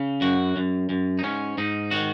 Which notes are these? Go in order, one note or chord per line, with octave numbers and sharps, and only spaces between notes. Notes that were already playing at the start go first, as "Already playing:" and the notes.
Already playing: C#3
F#2 F#4
F#2
F#2
D#4
G#2 C#4
G#2 D#4
D#3 F#4